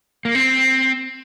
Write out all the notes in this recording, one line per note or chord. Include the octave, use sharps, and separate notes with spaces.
A#3
C4